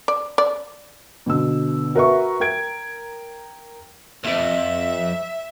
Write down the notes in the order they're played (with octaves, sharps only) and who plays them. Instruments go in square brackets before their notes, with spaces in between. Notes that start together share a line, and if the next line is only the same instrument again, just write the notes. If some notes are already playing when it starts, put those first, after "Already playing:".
[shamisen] D5
D5
[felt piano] B2 D3 E6
F#4 A#4 B4 E5 C#6
A#4 G5 G#6 D7
[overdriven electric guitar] C2 F2 [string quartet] E5